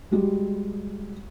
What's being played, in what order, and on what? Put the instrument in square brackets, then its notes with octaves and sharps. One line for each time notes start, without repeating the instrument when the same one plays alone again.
[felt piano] G3 G#3 F#4 G4